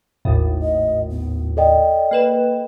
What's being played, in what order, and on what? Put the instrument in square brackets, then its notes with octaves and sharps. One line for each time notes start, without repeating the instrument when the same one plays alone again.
[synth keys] G#1 D#2 A2
[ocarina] D#5
B3
[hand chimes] A4 D#5 G5 [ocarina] D5
[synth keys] A#3 B4 E7